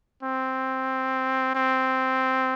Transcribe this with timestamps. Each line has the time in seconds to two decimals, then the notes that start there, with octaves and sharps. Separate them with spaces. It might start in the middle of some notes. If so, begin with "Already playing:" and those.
0.23 C4
1.55 C4